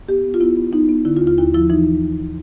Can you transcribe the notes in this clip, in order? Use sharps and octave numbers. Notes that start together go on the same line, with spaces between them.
B3 G4
B3
F4
B3 E4
B3
B3 D#4
B3
D3 E4
F4
D#2
F4
D#2 E4
F3 E4
E3 D#4